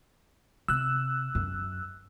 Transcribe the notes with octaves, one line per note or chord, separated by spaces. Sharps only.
C3 E6 F#6
F#2